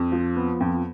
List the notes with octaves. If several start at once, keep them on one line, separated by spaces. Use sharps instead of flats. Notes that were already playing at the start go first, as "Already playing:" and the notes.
Already playing: F2
F3
B3
F2